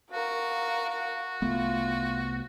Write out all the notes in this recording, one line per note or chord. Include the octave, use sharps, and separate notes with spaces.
F#4 A#4 F5
F#4
C2 A3 B3 F4